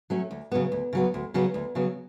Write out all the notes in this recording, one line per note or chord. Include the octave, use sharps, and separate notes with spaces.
F#3 A3 C#4
D2
C#3 F#3 B3
D2
C#3 F#3 B3
D2
C#3 F#3 B3
D2
C#3 F#3 B3